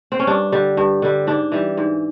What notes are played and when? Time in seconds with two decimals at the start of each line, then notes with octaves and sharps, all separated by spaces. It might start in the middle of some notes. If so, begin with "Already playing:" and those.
0.12 C4
0.19 C#4
0.27 G2 D4
0.52 D3 G3
0.77 G2
1.02 D3 G3
1.27 G#2 D4
1.52 E3 G3
1.77 G#2